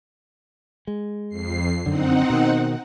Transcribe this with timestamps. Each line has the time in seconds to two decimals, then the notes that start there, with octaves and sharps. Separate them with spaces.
0.87 G#3
1.29 F2 C7
1.86 F#2 D3 C4 D#4 F#5
2.30 B2 D#3